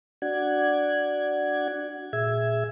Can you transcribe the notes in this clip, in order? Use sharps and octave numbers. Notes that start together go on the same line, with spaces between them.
D4 F#4 D5 F#5 G#6
A#2 G#4 E5 E6 G#6